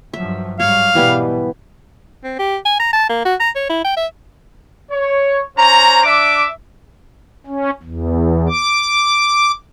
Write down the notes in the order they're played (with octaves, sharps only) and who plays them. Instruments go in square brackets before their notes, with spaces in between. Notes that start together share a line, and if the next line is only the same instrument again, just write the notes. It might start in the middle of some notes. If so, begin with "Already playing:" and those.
[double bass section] G2 F3 F#3 [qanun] E5
[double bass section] G#2 F#3 G3 [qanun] C#5 D6 [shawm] F5
[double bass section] G#2 B2 [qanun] E3 G3 B3
[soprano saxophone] C4
G4
G#5
A#5
A5
A#3
F#4
A#5
C#5
E4
G5
E5
[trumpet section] C#5
C#4 C5 A#5
D4 E5 D6
[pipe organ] C#4
E2
D6